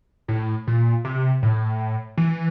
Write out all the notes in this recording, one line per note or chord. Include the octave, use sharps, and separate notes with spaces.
A2
A#2
C3
A2
E3